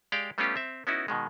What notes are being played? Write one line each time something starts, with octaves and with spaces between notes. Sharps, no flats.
G#3 G4 D5 F5 G5
G3 A3 B3 C#4 F4 G4
C4 E5
B3 C#4 D#4 E4 F#4
B2 D#3 G#3